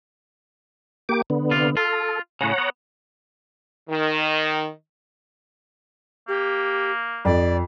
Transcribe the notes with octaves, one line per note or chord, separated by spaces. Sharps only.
A#3 G4 D6
D3 B3
C3 F4
F4 A4
A2 C#3 C#5 F#5 A#5
B3
D#3
A#3 G4
F2 D5